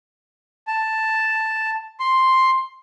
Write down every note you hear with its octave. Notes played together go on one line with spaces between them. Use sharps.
A5
C6